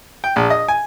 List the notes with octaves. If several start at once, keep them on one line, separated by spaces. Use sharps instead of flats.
G5
A#1
D#5
G#5